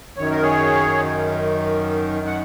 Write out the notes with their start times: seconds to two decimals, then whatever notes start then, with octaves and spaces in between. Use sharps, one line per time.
0.17 F#2 D#3 C#5
0.31 A#4
0.42 G#4 C#5
2.27 F#5